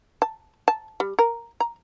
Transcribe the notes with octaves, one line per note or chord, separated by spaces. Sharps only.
A5
A5
G3
A#4
A#5